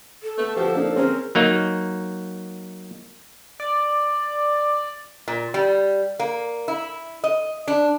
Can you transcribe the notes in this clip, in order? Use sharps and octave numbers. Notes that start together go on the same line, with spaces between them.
A4
A3 B3
F3 F#4 G4
A#3 D4 D#4
C4 C#4 G#4 A#4
F#3 A#3 D#4
D5
A#2
G3
A#3
E4
D#5
D4